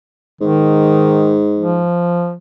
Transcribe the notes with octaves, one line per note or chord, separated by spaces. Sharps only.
G#2 D#3
F3